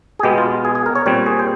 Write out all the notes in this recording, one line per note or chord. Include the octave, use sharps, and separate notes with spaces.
G#4
B2 G#3 B3 G4
F4
G#4
G#4
A#4
C#5
A#2 G3 C4 C#5
G#4
C5